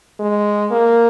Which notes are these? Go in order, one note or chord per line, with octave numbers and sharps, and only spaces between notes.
G#3
A#3